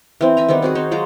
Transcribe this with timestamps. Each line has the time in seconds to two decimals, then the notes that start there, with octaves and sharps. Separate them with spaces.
0.21 E3 C4
0.37 E5 G#5 A#5
0.49 D#3 G3 B3 C4
0.62 C4 F#4 G#4
0.75 D#4 C5 C#5
0.91 F#3 G#3 F4 A#5